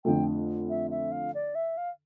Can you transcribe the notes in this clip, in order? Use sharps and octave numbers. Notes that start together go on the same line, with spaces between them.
F2 D3 F3 A3 G5
E5
E5
F5
D5
E5
F5